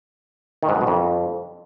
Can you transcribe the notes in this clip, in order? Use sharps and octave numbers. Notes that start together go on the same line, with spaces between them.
D#3
G#2
F#2
B2
F2